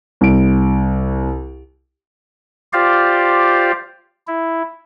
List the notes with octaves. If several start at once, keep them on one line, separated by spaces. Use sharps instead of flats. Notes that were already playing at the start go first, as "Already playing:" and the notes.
C2 D7
F4 G4 C5 D5 F5
E4